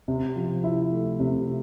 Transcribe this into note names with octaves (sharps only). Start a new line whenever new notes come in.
C3
F3
E4
A3
C3